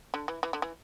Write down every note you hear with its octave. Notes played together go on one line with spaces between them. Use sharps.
D3
E3
E3
D3
E3